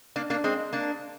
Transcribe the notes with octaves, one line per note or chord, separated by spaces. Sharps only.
A#3 D4
A#3 D4
G#3 C4
A#3 D4